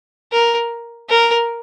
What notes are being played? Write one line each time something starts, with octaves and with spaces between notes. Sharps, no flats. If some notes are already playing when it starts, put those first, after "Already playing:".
A#4
A#4